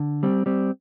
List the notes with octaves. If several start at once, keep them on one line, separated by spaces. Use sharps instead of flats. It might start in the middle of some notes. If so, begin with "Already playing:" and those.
Already playing: D3
G3 C4
G3 C4